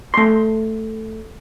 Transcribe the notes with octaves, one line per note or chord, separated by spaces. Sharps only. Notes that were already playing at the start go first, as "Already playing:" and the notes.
A3 C6